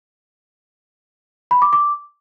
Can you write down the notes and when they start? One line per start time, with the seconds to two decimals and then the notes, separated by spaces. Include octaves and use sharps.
1.51 B5
1.62 D6
1.73 D6